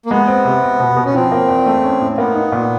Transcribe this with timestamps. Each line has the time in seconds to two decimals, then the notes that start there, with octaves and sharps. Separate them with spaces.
0.06 A#3
0.10 G#3 B3
0.28 C4
0.45 C3
0.63 C4
0.80 B2
0.97 B2
1.05 C#4
1.14 F3 C4
1.32 A#3
1.49 E2
1.66 A3
1.84 C#4
2.01 A2
2.18 A#3 B3
2.35 D#4
2.52 A#2